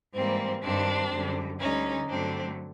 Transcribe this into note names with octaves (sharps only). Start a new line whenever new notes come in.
G#2 E3 G3 A#3 C4
G2 D#3 G3 C4 D4
F#2 D3 G3
D2 D3 G3 C#4 D#4
G2 D3 F#3 A3 C4 D4